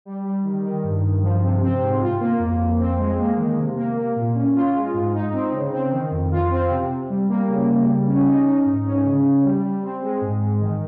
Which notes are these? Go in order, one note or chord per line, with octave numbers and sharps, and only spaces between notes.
G3
G3
D#3
D#3
G2
G2
F3
C3
C4
G#2
F4
A#3
F2
F2
C4
G#3
A#3
D#3
C3
A#3
A#3
A#2
C#4
F4
G#3
G#2
D#4
C4
C#3
C4
D#3
F2
F4
C4
C3
C3
G3
A#3
C#3
C#3
G3
C#4
D#4
D#4
G#2
C#4
C#3
C#3
G3
G3
C4
G#3
G#2
G#2
D#3